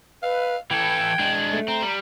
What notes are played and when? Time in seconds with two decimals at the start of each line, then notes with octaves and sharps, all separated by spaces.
0.23 B4 F5
0.71 E3 A4 G5 G#6
1.19 G#3 D4
1.53 A3
1.68 C4 A#5
1.82 G3